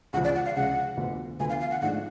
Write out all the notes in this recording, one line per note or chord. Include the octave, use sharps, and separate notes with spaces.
C#2 C#3 F3 F#5
D5
F#5
F5
C#2 C#3 F3 F#5
D2 D3 F3 B3
D2 D3 F3 B3 G#5
F5
F5
F#5
G#2 F3 A3 D4 F4 F#5